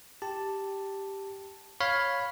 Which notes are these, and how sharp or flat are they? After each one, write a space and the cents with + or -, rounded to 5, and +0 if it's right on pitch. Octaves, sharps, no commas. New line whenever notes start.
G4 +0 A5 +5
C#5 +0 F5 +10 B5 +0